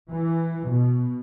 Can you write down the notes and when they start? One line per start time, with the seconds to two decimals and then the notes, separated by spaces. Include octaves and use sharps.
0.11 E3
0.69 B2